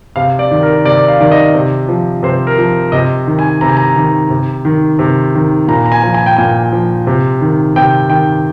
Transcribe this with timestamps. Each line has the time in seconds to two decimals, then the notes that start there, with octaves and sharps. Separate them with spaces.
0.16 C3 F5
0.39 D5
0.51 D#3
0.63 A#4
0.85 C3 D5
1.08 F5
1.20 D#3 D5
1.31 D#5
1.54 C3
1.88 F3
2.23 C3 C5
2.47 A#4
2.58 F3
2.92 C3 D#5
3.27 D#3
3.39 G#5
3.61 C3 A#5
3.69 G#5
3.77 A#5
3.96 D#3
4.31 C3
4.65 D#3
4.99 C3
5.35 D#3
5.68 A#2 A#5
5.86 A#5
5.92 G#5
6.03 F3
6.14 G#5
6.26 G5
6.37 A#2 G#5
6.72 F3
7.07 C3
7.41 D#3
7.76 C3 G5
8.10 D#3 G5